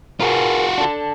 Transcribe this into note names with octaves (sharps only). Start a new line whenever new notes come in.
F4 F#4 G#4 A#4 B4
D4 A4